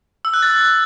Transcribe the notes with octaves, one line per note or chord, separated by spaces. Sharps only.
E6
F#6
A6